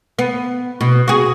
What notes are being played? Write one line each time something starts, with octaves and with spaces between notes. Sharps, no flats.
B3
B2
F#4 G#4